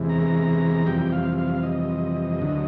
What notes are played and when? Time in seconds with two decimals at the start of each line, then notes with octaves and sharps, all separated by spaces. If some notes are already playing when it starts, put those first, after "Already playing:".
Already playing: E2 C3 E3 G#3
0.09 A#5
0.86 F2 C3 E3 G3 G5
1.12 F5
1.38 F5
1.63 D#5
2.41 D2 D3 F#3